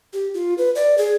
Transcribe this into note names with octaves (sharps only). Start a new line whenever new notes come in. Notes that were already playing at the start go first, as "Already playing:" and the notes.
G4
F4
B4
D5
G#4